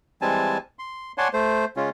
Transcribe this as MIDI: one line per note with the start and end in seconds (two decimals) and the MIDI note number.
0.21 0.58 52
0.21 0.58 55
0.21 0.58 56
0.21 0.58 60
0.21 0.58 80
0.21 0.58 81
0.79 1.12 84
1.18 1.28 73
1.18 1.28 74
1.18 1.28 78
1.18 1.28 80
1.18 1.28 81
1.18 1.28 84
1.33 1.65 57
1.33 1.65 72
1.76 1.89 49
1.76 1.89 56
1.76 1.89 61
1.76 1.89 65